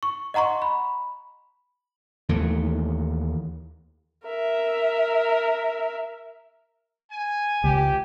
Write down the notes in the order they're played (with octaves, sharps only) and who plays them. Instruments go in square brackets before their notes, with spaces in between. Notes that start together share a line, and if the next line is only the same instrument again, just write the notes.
[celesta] C#6
D#5 F#5 A#5 C6 C#6
B5
[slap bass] D#2 E3 A3
[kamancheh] A#4 E5
[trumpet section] G#5
[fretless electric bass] C#2 [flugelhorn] G4